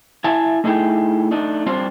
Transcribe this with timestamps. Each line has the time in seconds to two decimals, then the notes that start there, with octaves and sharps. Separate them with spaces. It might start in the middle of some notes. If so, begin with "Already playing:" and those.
0.24 E4 E5 G#5 A5
0.64 A3 D#4 E4 G#4 A4 G5
1.31 A3 D4 D#4
1.66 G3 C4 D4 F4 C5